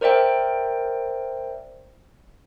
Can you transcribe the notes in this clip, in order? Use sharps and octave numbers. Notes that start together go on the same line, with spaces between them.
A#4 C5 D5 E5 G5